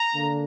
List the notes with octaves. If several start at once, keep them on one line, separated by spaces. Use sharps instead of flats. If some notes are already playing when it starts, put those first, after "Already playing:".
Already playing: A#5
D3 A#3 D4